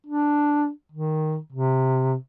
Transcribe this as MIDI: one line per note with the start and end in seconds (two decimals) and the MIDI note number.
0.06 0.70 62
0.92 1.38 51
1.52 2.16 48